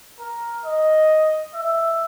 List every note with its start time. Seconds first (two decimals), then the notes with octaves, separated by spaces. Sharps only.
0.20 A#4
0.65 D#5
1.54 E5